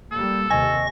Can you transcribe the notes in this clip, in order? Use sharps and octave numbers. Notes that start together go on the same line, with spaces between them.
G3 A#3 A4
D#2 C3 D#5 G#5 C#6 A#6